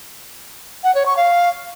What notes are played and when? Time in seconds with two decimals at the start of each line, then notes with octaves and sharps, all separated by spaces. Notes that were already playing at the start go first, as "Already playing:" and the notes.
0.84 F#5
0.95 C#5
1.06 C#6
1.17 F5